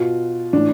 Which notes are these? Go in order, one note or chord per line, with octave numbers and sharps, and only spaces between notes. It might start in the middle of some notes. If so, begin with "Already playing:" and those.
Already playing: B2 F4
A2 E3 D4